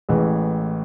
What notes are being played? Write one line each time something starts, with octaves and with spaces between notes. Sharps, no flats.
A1 A2 E3 G#3